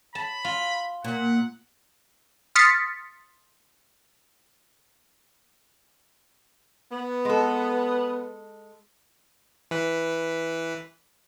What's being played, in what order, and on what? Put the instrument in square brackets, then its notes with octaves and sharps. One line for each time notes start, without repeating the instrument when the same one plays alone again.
[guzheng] A5 [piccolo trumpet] B5
[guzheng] F4
[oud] A#2 [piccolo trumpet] F#5
[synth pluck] C6 D#6 F6 A6 B6 C#7
[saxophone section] B3
[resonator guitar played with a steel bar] G#3 A4
[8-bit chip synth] E3 B4